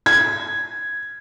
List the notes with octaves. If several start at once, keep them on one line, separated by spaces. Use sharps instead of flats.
G#6